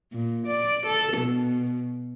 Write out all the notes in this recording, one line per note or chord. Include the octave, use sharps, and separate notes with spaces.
A#2
D5
A4
B2